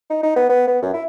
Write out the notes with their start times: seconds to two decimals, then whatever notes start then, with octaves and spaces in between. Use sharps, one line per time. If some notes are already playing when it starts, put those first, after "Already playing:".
0.10 D#4
0.23 D#4
0.36 B3
0.49 B3
0.67 B3
0.82 F#2
0.93 E4